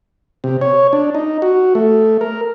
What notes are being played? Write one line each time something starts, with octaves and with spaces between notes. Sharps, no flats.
C3
C#5
D4
D#4
F#4
A3
A#4